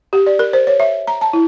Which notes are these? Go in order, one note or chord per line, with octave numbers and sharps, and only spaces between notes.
G4
D5
A#4
C5
C#5
E5
A#5
A5
E4